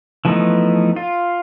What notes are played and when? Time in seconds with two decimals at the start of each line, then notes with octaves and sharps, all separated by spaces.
0.25 E3 F3 A3 B3 D#4
0.96 F4